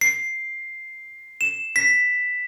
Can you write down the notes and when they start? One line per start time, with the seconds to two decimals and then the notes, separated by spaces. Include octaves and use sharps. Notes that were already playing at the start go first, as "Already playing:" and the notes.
0.01 C7
1.41 E7
1.76 B6